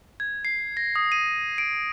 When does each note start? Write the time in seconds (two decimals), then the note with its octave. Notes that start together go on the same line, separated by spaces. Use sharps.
0.20 G#6
0.45 C7
0.77 A#6
0.96 D#6
1.12 D#7
1.58 D7